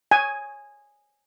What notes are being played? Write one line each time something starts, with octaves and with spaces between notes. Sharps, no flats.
G#5